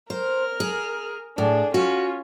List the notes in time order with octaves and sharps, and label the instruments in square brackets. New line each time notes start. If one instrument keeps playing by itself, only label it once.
[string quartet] A#4 F6 [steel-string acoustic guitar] C5
[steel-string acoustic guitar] G#4
[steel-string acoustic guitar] A2 [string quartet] D4 G#4
[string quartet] C#4 F4 [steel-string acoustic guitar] F#4